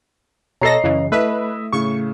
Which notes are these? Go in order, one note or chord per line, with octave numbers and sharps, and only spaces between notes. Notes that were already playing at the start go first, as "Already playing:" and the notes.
B2 A4 C#5 D#5 A#5 A#6 C7
F#2 C#3 E3
A3 E4 B4 D#5 E5
A2 C#3 C#6